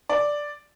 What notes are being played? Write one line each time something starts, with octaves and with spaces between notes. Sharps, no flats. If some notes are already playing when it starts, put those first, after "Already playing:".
D5